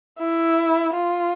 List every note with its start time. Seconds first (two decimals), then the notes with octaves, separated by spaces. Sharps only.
0.19 E4
0.93 F4